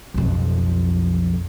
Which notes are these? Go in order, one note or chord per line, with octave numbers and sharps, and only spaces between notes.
B1 F2